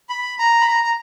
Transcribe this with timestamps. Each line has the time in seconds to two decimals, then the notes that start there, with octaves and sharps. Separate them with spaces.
0.09 B5
0.39 A#5
0.61 B5
0.68 A#5
0.83 A#5